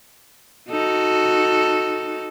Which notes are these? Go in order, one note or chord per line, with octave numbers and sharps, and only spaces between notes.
D#4 F#4 A4